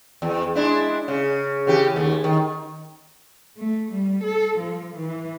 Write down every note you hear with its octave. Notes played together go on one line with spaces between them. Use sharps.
E2
G#3 D4 E4
C#3
C#3 E3 G4
D#2 A3
D#3
A3
G3
A4
F3
E3